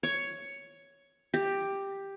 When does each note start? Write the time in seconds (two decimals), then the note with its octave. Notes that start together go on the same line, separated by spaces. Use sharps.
0.03 C#5
1.34 G4